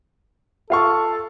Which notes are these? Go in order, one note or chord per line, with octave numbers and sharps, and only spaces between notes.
F4 A4 F5 C#6